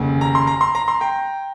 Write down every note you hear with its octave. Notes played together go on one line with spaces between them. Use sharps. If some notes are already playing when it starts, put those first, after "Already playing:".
Already playing: F1 D#2 C#3
A#5
C6
A#5
C6
A#5
C6
G5 A#5